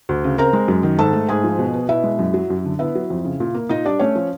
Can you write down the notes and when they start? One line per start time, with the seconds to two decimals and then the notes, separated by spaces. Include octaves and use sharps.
0.09 D2
0.24 C#3
0.38 C4 A#4 A#5
0.53 G#3
0.68 F#2
0.83 D#3
0.99 G#2 A4 A5
1.13 A3
1.29 G#2 G#4 G#5
1.44 F3
1.59 B2
1.74 B3
1.89 B2 E4 E5
2.04 G#3
2.19 F#2
2.34 F#3
2.50 F#2
2.65 D3
2.79 B3 E4 E5
2.95 F#3
3.10 F2
3.25 C#3
3.40 A#2
3.54 A#3
3.69 A#2 D#4 D#5
3.85 G3 D4 D5
3.99 A3 C#4 C#5
4.15 F3